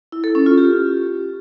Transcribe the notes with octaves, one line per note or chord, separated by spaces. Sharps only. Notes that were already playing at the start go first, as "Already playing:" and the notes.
E4
A4
C#4
F4
G4